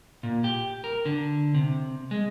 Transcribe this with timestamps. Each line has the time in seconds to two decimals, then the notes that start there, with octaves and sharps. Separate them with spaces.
0.23 A#2
0.44 G4
0.84 A#4
1.05 D3
1.55 C3
2.11 G#3